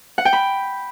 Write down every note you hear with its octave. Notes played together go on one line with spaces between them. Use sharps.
F#5
G5
B5